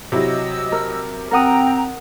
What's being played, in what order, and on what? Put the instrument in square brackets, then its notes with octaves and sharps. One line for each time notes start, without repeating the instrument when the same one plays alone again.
[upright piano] C3 F#3 E4 [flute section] D#5 E6
[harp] A#4
[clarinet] C4 [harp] A#4 F#5 D#6 [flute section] G5 A#5